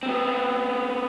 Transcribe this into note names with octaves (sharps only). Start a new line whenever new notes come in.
B3 C4